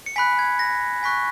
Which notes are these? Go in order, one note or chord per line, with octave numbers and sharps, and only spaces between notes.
C#7
G#5 B5 F#6 B6
G#6
A#6
G#5 C#6 F#6 B6